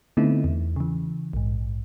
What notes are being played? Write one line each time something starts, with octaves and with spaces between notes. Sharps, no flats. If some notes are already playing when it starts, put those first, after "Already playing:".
D3 A3 B3 C4 D#4 E4
E2
C#3 E3
A#1 G#2